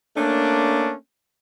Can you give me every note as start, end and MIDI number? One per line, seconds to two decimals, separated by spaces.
0.16 0.93 57
0.16 0.93 58
0.16 0.93 61
0.16 0.93 62